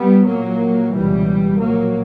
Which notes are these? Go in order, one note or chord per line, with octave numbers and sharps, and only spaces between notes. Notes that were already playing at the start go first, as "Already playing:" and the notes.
Already playing: G3 B3
A#1 A#2 F#3 A#3
C#2 B2 E3 G3
A#1 A#2 F#3 A#3